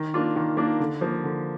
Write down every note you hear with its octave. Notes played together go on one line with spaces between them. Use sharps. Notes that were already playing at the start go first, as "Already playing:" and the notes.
Already playing: D#3
A#3 D4 F4
D#3
A#3 D4 F4
D3
F3 A#3
D3